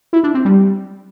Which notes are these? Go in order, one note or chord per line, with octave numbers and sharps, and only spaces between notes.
E4
D4
C4
G3